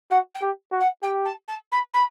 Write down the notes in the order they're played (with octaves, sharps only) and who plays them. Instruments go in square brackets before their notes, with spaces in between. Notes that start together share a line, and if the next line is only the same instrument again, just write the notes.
[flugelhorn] F#4 [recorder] F#5
[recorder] G5
[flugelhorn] G4
F#4
[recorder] F#5
[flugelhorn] G4 [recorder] G5
[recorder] A5
A5
B5
B5